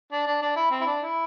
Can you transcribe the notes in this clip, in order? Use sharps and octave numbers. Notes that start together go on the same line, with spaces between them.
D4
D4
D4
E4
C4
E4
D4
E4